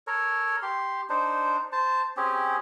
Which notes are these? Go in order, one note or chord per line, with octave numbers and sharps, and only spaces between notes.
A4 A#4 C#5
G4 C6
D4 D#4 C5
C5 A5
C4 C#4 G4 G#4